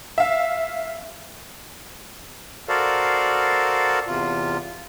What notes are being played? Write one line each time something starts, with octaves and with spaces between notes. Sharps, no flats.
E5 F5
F#4 A4 A#4 C5 D5 F5
E2 C3 F4